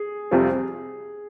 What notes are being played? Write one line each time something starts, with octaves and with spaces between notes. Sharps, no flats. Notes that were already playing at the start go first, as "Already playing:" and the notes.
Already playing: G#4
F2 C3 G3 C4 F4